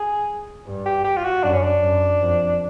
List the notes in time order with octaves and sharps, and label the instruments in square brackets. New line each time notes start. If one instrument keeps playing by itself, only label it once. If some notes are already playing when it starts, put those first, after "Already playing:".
Already playing: [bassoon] G#4
[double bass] G2
[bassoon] G4
G4
F4
F#4
[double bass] F#2 [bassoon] D4
[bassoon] C#4
D4
[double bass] F#2
F2